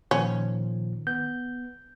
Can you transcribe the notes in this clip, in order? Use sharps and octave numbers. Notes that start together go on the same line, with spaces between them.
A#2 D#3 F3 C#4
B3 G6